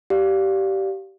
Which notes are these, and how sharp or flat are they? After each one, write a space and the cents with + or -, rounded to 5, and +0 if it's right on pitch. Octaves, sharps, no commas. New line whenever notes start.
G4 -20 D5 +0 F5 +5